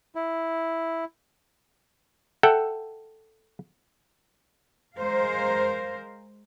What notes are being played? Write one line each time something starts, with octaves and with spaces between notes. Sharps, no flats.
E4
A4 E5 F#5 G5
G#3 A#4 C5 F5